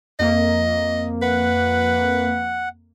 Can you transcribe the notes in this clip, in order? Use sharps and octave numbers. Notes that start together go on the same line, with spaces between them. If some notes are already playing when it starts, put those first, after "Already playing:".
F2 A#3 D#5
B4 F#5